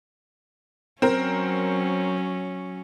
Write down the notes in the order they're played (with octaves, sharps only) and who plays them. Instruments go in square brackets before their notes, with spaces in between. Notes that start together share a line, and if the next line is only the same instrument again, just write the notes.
[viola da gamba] F#3 C#4 [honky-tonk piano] C4 A#4